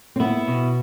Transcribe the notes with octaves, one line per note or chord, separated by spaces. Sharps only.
C4
B3 E4
B2